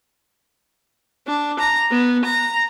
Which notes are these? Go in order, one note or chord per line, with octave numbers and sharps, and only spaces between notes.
D4
A#5
B3
A#5